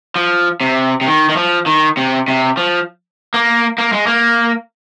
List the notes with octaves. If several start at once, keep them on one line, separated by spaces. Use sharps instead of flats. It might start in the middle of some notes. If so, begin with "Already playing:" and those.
F3
C3
C3
D#3
D#3
F3
D#3
C3
C3
F3
A#3
A#3
G#3
A#3